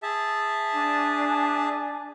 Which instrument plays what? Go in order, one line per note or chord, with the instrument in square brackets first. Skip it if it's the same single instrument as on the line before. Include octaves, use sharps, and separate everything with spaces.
[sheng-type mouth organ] G#4 E5 A5
[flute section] D4 G#5